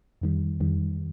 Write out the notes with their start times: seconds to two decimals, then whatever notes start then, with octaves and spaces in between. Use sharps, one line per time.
0.21 F2 D#3 G3
0.60 F2 D#3 G3